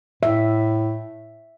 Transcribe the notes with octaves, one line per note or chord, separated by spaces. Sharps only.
A2 E5